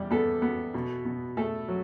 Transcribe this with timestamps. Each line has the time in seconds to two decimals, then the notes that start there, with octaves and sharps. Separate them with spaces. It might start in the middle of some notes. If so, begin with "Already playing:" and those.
Already playing: E2 G3
0.11 B3 A4
0.42 B3
0.74 B2
1.05 B2
1.37 A3 A4
1.68 F#3